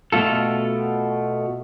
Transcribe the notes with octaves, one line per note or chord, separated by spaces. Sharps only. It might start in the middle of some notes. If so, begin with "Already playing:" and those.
B2 A3 F4 A4